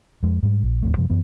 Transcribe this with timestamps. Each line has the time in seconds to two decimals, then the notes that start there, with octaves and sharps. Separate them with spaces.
0.23 F2 G#3
0.43 G#2 G3
0.63 A#1
0.82 D1 F2 A3
0.97 F#2 C3 F3 G#3
1.10 F#2 E3 B3